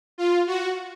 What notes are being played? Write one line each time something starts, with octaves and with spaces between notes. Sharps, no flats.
F4
F#4